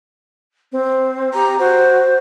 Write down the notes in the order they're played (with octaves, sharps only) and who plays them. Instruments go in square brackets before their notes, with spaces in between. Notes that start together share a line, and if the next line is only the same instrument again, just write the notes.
[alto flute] C4
[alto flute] G4 [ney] A#5
[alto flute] F#4 [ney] C5